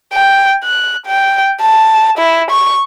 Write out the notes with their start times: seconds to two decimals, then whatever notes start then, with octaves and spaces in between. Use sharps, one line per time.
0.13 G5
0.64 F#6
1.07 G5
1.62 A5
2.18 E4
2.51 C#6